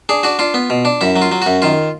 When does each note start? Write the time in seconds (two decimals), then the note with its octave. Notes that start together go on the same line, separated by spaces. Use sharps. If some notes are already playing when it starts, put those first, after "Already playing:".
0.09 D4 G#4
0.23 D4 F#4
0.39 D4 F4
0.54 B3
0.70 B2
0.85 D4
1.01 F#2 E4
1.16 F#3
1.22 F4
1.32 F#3
1.42 F#2 F#4
1.62 D#3 F4